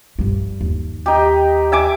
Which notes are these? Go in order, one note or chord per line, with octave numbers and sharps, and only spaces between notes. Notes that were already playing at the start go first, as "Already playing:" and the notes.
G2 G3
D#2
D#4 G4
E5 G#5 D6